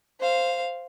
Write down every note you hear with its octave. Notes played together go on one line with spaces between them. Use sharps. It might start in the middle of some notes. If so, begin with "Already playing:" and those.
C5 F5